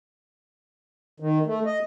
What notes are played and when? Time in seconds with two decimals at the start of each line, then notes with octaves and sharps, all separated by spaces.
1.20 D#3
1.46 A3
1.66 D#5